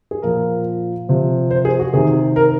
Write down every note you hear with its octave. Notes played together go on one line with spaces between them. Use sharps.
G#4
A#2 F3 A#4
C3 F3
C5
G#4
F#4
C3 D#3 G#4
A#4